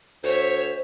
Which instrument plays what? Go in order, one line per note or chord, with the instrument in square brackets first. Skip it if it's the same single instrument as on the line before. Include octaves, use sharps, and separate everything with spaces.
[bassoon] D2 [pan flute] C5 [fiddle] C#5 E5